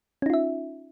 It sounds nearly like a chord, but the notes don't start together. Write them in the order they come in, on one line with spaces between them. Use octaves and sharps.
C#4 D#4 F4 E5